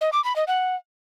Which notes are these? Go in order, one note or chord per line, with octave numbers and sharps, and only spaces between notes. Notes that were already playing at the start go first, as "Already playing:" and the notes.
D#5
D6
B5
D#5
F#5